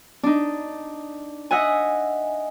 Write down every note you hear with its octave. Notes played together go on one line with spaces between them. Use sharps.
D4 D#4
D#5 E5 F#5 G#5